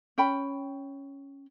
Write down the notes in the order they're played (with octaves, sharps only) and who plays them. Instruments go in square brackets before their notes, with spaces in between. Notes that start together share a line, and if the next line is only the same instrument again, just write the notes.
[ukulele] C#4 G5 B5